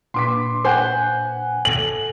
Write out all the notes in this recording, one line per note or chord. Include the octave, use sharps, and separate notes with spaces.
A#2 D4 B4 C6 D6 B6
C5 F#5 G#5
A4 F#7